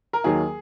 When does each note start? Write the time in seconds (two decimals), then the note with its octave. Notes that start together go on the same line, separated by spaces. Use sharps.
0.13 A#4
0.24 D#2 D#3 F#3 A#3 G#4